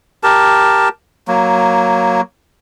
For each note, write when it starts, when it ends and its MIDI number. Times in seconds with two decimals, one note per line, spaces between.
0.23 0.89 67
0.23 0.89 70
0.23 0.89 81
1.28 2.21 54
1.28 2.21 58